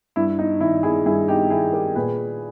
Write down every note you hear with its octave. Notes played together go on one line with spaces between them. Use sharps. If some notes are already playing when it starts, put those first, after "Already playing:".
G2 E4
D#4
D#3 E4
E4 G#4
G2 E4 G#4
D#4 G4
D#3 E4 G#4
G4 A#4
A#2 G#4 B4